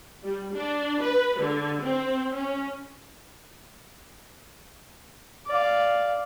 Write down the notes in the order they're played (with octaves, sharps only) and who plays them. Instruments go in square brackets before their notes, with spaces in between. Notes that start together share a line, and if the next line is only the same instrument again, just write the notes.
[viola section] G3
D4
B4
D3
C4
C#4
[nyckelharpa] D5 F5